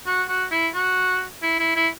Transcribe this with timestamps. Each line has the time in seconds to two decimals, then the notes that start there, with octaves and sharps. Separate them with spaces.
0.06 F#4
0.28 F#4
0.51 E4
0.74 F#4
1.43 E4
1.59 E4
1.76 E4